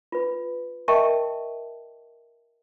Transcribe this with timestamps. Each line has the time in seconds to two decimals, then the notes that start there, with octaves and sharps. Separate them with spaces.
0.12 F4 B4
0.88 A#4 D#5 E5 G5 A5 C#6